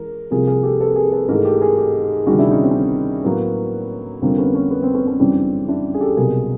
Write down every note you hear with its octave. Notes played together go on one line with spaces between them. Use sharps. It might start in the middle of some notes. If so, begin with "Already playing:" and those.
Already playing: E3 G#3 A#4
C2 C3 F3 A#3 G#4 A#4
G#4 A#4
G4 A4
A4 B4
G#4 A#4
A4 B4
G#2 E3 A3 G#4 A#4
G4 A4
G#4 A#4
G4 A4
D2 C3 D#3 G3 F#4 G#4
D4 E4
C#4 D#4
C4
C#4
C4
A2 F#3 A#3 B3
F2 D3 G3 A#3 C4
B3 C#4
B3 C#4
B3
C4
B3 C#4
B3 C#4
F#2 C#3 E3 G3 C4 D4
D4 E4
G#4
G4 A4
C2 B2 F#3 A#3 G#4 A#4